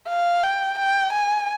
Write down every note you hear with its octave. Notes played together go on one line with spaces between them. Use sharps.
F5
G5
G5
G#5